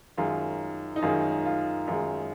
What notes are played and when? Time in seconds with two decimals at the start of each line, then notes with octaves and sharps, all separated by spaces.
0.17 F#2 D#3 G#3 F4
0.96 D#4
1.02 F#2 D#3 G#3 F4
1.46 F4
1.88 F#2 D#3 G#3 F4